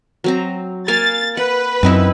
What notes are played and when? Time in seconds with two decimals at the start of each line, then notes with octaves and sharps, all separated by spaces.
0.24 F#3 C4 A#5
0.88 A#3 F5 G#5 A6
1.37 B4 F#5
1.83 F#2 C4 D#4 E4